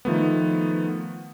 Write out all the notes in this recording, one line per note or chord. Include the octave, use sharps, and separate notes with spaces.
D#3 F3 A3 B3